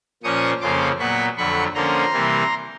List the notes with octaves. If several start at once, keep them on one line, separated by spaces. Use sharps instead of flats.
A#2 F3 A#3 C#4 C#6 D#6
F2 C#3 F3 A#3 C#4 C6 D6
A#2 F#3 B3 B5 C#6
F2 D3 F#3 B5 C#6
D3 F3 A#3 C#4 A#5 C6
C3 E3 G3 A#3